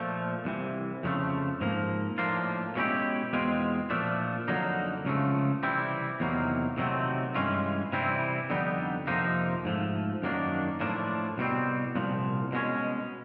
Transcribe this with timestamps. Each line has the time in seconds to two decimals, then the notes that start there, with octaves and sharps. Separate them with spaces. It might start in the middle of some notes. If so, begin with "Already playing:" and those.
Already playing: A#2 F3 A3
0.45 C2 C3 E3
1.03 F2 C#3 F3 A3
1.61 G#2 F3 A#3
2.18 A2 F3 A#3 D4 F4
2.75 B2 G#3 C#4 E4 G4
3.33 E2 B2 G#3 C4 F4
3.90 A#2 F3 A3 D4
4.48 F2 D3 F#3 A#3 D#4
5.05 C#2 C#3 F3 A3
5.63 C3 E3 G3 C4 E4
6.20 E2 C3 D#3 F#3 A#3
6.78 C3 D#3 F#3 A3 C4
7.35 G2 E3 G#3 C#4 F4
7.93 C3 E3 G3 C4 E4
8.50 F2 D3 G3 B3 D#4
9.07 F2 C3 F3 A#3 D#4
9.65 G#2 F3 A3
10.23 F#2 D#3 F#3 A#3 D4
10.81 A2 F3 A#3 D4
11.38 C2 B2 G3 C4
11.96 C2 A#2 F3
12.52 B2 G#3 C#4